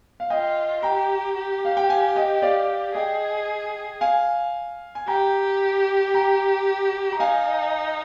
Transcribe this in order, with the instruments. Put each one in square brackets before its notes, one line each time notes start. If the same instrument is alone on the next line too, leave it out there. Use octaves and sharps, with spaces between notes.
[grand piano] F5
[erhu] F4 [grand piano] D#5 G5
[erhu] G4 [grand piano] G5 A#5
[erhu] G4
[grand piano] F5
G5
F5 G#5
D#5 G5
D5 F5
[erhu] G#4 [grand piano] D#5 G5
[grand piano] F5 G#5
G#5
[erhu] G4 [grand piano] G5 A#5
[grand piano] G5 A#5
A#5
[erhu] D#4 [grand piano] F5 G#5